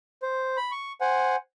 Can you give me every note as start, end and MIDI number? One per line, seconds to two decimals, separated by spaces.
0.23 0.57 72
0.57 0.71 83
0.72 0.92 85
1.01 1.36 72
1.01 1.36 78
1.01 1.36 80